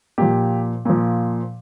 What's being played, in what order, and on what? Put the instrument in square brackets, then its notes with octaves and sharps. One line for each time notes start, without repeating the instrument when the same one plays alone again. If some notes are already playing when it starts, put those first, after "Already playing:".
[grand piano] A#2 F3 G4
A#2 F3